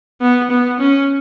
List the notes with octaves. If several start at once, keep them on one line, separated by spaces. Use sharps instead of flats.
B3
B3
C#4